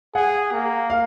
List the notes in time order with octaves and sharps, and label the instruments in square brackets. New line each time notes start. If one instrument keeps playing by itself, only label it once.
[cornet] G#4 [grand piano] F#5
[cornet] A#3
[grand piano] F5